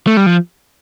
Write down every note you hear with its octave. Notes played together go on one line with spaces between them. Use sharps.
A3
G3
F3